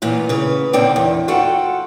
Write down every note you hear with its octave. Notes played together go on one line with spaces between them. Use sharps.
A#2 E3 B3 F4
C#3 B4
A#2 D3 C4 D5 G5
E2
F4 F#4 A4 F#5 G5